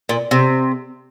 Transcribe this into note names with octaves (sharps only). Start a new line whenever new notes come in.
A#2
C3